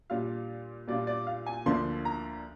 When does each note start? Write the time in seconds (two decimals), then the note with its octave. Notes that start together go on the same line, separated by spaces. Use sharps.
0.10 A#2 G3 D4 F4 F5
0.88 A#2 G3 D4 F4 D5
1.07 D5
1.27 F5
1.46 G#5
1.66 D2 D3 F3 A#3 D4 C6
2.05 A#5